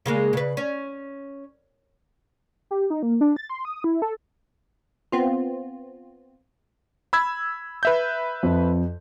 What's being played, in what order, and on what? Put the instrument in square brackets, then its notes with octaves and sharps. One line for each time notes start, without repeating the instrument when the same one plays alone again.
[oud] C#3 G#3 A#3
C#3 B4
C#4
[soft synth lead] G4
D#4
A#3
D4
A6
C6
D#6
E4
A4
[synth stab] B3 C4 F4
[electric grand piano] B5 E6 G#6
B4 E5 G6
[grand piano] F2